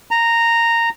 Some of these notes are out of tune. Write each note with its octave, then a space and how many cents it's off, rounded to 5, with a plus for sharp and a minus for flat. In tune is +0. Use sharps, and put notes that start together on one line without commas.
A#5 -10